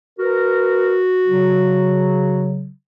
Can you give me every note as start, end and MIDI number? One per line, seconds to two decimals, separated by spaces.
0.19 2.48 66
0.19 1.01 70
0.19 1.01 71
1.26 2.69 49
1.26 2.69 54